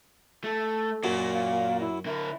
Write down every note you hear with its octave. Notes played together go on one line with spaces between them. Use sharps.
A3 A4
F#2 A#2 F#3
F5
E4
D3 E4 A#4